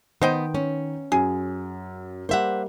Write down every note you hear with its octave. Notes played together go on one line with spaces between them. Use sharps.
D#3 B3 C5 D#5 G5
C#4
F#2 G#4
G3 A#3 C5 E5 F#5